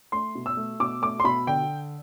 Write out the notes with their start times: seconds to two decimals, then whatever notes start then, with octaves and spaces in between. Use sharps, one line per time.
0.12 A3 C6
0.35 B2
0.46 E6
0.57 A3
0.80 B2 D6
1.02 A3 D6
1.20 C6
1.24 B2 B5
1.47 D3 G5